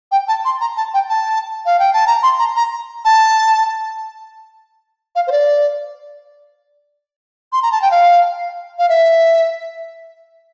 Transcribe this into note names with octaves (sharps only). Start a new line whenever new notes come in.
G5
A5
C6
A#5
A5
G5
A5
F5
G5
A5
A#5
C6
A#5
A#5
A5
F5
C5
D5
C6
A#5
A5
G5
F5
F5
E5